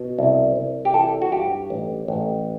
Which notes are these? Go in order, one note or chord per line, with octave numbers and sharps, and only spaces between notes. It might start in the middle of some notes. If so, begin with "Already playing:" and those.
Already playing: B2
C2
C2
G4
E3 A4
F#4
G2 G4
A1
A1